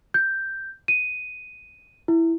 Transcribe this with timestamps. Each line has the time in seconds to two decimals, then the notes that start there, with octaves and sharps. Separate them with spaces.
0.14 G6
0.88 D#7
2.08 E4